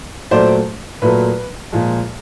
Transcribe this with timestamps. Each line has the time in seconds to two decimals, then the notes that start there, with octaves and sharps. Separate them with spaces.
0.31 A#2 F#3 A3 C5 D5
1.02 A#2 F#3 A3 B4
1.72 A#2 F3 G#3